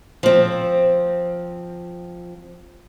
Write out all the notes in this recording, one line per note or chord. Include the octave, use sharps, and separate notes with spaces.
F3 C4